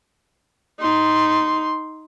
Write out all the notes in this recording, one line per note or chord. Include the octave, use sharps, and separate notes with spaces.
D#4 C6